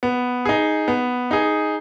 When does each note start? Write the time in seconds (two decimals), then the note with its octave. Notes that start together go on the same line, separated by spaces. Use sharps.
0.03 B3
0.45 D#4 G#4
0.88 B3
1.31 D#4 G#4